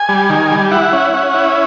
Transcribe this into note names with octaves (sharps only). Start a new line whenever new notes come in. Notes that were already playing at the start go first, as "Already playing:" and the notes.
Already playing: G#5
G3
D#3
G3
E4 F#5
C#4
C#4
E4